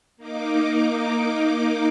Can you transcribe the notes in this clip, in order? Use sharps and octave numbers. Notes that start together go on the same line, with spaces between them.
A#3 D#4 D6